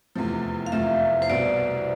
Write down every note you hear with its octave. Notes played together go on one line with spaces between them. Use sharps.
F1 E2 C3 F3
F5
F1 E2 C3 F3 E5
C5
C2 B2 B3 D5